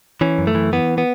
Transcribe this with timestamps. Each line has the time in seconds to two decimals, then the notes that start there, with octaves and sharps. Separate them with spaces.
0.21 E3 C#4
0.38 F#2
0.47 A3
0.55 E3
0.73 E3 B3
0.98 B3